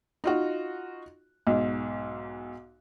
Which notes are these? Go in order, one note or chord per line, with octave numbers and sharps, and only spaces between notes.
D#4 F4 F#4
B1 G#2